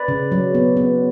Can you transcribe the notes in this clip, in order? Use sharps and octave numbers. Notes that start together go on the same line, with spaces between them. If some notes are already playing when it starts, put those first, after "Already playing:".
Already playing: B4 D5
C#3
F#3
B3
B3